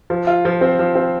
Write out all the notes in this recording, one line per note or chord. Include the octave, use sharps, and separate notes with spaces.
F3
F4
F3
C4
F3
C4